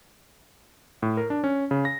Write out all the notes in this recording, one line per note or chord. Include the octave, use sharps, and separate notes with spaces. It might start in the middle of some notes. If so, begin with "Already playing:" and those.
A2
A#4
D4
C#4
C#3
A#6